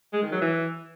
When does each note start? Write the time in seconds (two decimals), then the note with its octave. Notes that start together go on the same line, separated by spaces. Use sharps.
0.13 G#3
0.22 D#3
0.32 F#3
0.41 E3